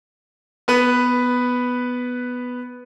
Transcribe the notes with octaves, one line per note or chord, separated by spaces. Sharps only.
B3 B4